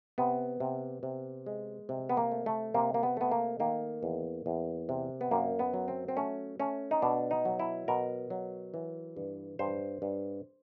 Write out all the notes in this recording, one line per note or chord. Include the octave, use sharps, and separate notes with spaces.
C3 B3
C3
C3
G#3
C3
B3
A#3
A3
A3
C3 A#3
A#3
B3
A3 B3
A#3
D#3 A#3
E2
E2
C3
B3
F#2 A#3
B3
F#3
C4
C4
A3 C#4
A3 C#4
D#4
B2 D4
D#4
F#3
E4
B2 A#4
F#3
E3
G2
G2 C5
G2